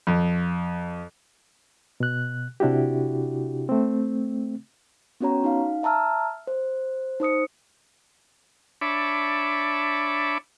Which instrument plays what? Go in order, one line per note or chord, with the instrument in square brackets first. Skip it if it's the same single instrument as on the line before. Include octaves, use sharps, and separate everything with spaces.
[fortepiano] F2
[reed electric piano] B2 F#6
C3 D4 E4 F#4 G4
A3 C4
[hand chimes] B3 C#4 F#4 C#5 A#5
D#4 F5
E5 A5 A#5 E6 F6
C5
D#4 C5 D#6 C#7
[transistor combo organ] D4 C#5 E5 A5 B5 D6